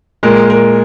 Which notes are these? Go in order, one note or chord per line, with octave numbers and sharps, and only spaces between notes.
A#2 G#3 A#4
A#4